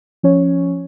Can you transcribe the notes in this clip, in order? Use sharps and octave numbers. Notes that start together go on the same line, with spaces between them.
F3 C#4 C#5